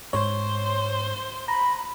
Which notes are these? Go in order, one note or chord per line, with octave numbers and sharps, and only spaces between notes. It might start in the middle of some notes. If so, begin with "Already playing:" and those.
G#2 C5 C#5 C6
A#5 B5